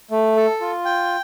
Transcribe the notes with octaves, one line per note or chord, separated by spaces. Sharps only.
A3
A4
F4
G5